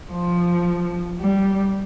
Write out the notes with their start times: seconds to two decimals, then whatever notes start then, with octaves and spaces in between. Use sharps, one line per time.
0.12 F3
1.21 G3